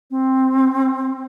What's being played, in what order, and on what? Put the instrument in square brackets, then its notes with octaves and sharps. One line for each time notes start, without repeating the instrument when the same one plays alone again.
[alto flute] C4